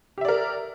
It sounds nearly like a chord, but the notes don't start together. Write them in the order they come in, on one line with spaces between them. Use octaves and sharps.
G4 E5 D5 A#4